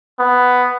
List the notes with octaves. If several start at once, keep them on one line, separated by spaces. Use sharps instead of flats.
B3